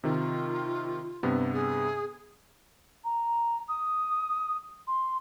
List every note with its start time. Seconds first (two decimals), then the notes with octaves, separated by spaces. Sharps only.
0.04 C3 D#3 F4
1.23 G2 C3 B3
1.54 G#4
3.04 A#5
3.69 D#6
4.87 C6